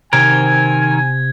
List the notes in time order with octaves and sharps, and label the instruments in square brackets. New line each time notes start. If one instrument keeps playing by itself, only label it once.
[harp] C3 [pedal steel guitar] D#3 C4 A#4 [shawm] G#5 [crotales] G#6